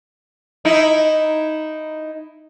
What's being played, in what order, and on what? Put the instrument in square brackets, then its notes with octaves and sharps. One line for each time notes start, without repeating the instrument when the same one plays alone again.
[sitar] D#4 E4